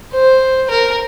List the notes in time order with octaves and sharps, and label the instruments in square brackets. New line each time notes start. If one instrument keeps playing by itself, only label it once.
[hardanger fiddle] C5
A#4